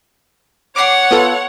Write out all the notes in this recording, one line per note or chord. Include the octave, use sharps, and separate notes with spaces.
C#5 F#5 D6 C7
B3 F4 A4